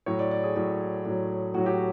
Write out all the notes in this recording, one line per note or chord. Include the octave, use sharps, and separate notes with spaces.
A2 F#3 C#5
D5
D5
G#4
A2 F#3
A2 F#3
A2 F#3 F#4
G4